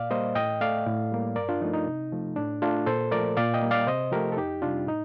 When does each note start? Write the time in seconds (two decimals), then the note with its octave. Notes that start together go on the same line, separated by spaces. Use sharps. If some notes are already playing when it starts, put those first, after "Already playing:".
Already playing: A#2 D5 F5
0.10 G3 A#3 C5 D#5
0.35 A2 D#5 G5
0.61 A3 D5 F5
0.87 A2
1.12 G3 A#3
1.36 G2 A#4 D5
1.49 D4 F4
1.61 F3 A3 D#4
1.73 D#4
1.86 C3
2.12 F3 A3
2.36 A2 D4
2.62 A3 D4 F4
2.86 A#2 A4 C5
3.11 F3 A3 A#4 D5
3.37 A#2 D5 F5
3.54 D#5 G5
3.62 G3 A#3
3.71 D5 F5
3.87 C3 C5 D#5
4.12 F3 A3 G4 A#4
4.32 A4
4.37 F2 D#4 G4
4.62 C3 G3 D4 F4
4.88 A2 D#4